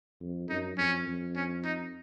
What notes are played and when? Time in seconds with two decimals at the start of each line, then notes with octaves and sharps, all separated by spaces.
0.20 F2
0.49 F#2 D#4
0.78 F2 C#4
1.07 F2
1.36 C#4
1.64 D#4